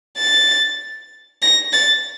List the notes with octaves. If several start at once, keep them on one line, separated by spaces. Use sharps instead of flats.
A6
A#6
A6